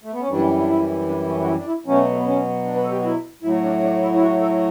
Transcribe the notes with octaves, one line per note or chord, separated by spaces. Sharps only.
A3
B3
C#4
F#2 E3 G3 D4
D4
E4
D4
C#4
F#4
E4
D4
E4
B2 F#3 A3 C#4
A3
B3
C#4
D4
B4
A4
G4
F#4
E4
A2 F#3 A3 E4
D4
D4
E4
E4
F#4
A4